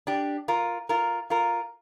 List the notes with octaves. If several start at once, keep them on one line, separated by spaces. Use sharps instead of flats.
D4 G4
F4 A#4
F4 A#4
F4 A#4